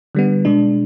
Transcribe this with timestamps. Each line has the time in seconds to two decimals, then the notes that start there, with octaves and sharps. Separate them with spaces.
0.15 D3 G3 B3
0.45 B2 G#3 D4